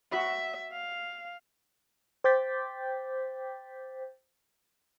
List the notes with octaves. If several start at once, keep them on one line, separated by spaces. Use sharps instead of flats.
F#4 E5 B5
F5
C5 G5 D6 G6 A6 B6